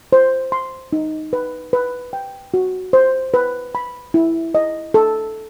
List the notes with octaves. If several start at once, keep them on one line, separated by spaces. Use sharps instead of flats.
C5
C6
D#4
B4
B4
G5
F#4
C5
B4
B5
E4
D#5
A4